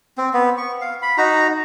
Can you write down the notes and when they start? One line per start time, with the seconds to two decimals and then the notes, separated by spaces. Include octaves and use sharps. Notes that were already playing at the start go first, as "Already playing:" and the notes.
0.18 C4
0.33 B3
0.58 C#6
0.81 F5
1.02 B5
1.18 D#4 F#4 A#5